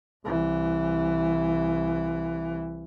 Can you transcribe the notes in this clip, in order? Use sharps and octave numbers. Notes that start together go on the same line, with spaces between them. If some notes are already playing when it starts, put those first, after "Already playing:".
C2 E3